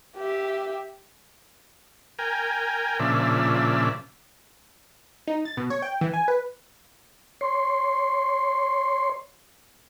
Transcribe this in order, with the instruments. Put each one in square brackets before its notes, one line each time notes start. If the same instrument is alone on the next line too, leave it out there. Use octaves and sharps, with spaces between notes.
[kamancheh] G4 E5
[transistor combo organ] A#4 G5 G#5
A#2 C#3 F3 D4 E5
[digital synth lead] D#4
A6
B2
C#5
G5
E3
G#5
B4
[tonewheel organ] C#5 C6